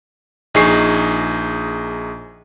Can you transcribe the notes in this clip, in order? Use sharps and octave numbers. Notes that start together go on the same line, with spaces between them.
A#1 D#4 G#4 C#6 C7